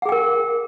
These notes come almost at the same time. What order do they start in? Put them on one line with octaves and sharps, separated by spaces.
F#5 G#4 G5 A#4